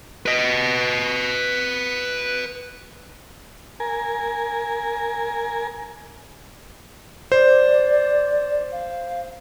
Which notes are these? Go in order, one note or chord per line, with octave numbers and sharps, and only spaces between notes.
B4 D#5
A#4 G#5
C5 D5
F5